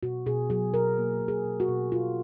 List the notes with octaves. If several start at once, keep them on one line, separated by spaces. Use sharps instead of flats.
B2 F#4
B2 G#4
F#3 G#4
B2 A#4
A#3
B2
G#4
B2
F#4
B2
B2 F4